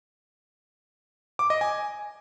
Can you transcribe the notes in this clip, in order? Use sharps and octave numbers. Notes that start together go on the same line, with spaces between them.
D6
D#5
G#5